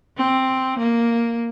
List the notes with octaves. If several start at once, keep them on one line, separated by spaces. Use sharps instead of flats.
C4
A#3